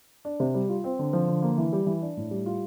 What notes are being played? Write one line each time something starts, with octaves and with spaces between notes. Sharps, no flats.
D4
C3
G3
F4
C4
D3
F3
D3
A#3
E3
G3
E3
D4
A2
G3
F4